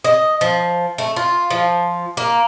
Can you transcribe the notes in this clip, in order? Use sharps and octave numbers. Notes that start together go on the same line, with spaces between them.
D#5
F3
A3
F4
F3
A#3